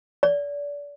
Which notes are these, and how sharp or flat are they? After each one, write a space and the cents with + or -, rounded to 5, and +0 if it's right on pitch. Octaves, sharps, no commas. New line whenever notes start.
D5 -30